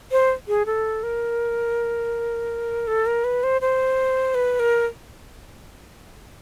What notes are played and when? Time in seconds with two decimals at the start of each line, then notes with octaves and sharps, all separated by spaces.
0.12 C5
0.48 G#4
0.66 A4
1.03 A#4
2.87 A4
3.06 A#4
3.24 B4
3.43 C5
3.61 C5
4.35 B4
4.60 A#4